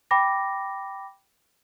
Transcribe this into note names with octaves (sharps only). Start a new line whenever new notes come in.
G5 B5 D6 A#6